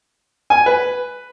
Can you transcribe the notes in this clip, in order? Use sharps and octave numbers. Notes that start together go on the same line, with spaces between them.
G#5
B4